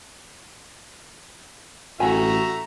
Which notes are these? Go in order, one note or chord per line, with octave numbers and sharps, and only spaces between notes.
A1 A3 F#4 G4 E5 G#5 A#5